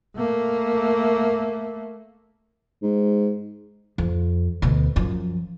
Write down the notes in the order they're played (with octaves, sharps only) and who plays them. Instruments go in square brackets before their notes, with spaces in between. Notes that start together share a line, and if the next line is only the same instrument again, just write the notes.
[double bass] A3 A#3
[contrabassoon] G#2
[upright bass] F2
D2 B2
F#2 F3